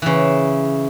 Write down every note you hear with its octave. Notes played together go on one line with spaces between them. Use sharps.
C#3 E3